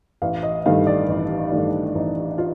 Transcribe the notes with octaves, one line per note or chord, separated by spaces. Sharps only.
A1 F5
D#5
G2 D#3 A3 F5
D5
A1
G2 D#3 A3 D4
A1 D#4
F4